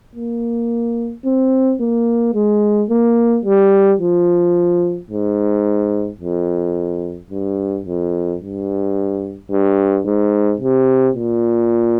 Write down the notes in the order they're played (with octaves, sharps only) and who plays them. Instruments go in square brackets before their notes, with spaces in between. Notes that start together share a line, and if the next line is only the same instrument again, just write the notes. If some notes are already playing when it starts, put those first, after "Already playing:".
[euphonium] A#3
C4
A#3
G#3
A#3
G3
F3
G#2
F2
G2
F2
G2
G2
G#2
C3
A#2